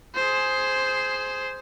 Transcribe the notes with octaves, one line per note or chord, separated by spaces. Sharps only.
G#4 C5